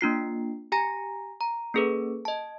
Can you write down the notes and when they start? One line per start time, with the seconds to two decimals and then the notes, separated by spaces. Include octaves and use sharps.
0.01 A#3 D4 F4 C7
0.72 G4 G#5 A#5 A#6
1.41 A#5
1.74 A#3 C#4 G#4 A4 B4
2.25 D#5 A5